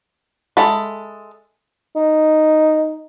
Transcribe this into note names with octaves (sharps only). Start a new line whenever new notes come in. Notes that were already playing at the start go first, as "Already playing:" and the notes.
G#3 A4 E5 B5
D#4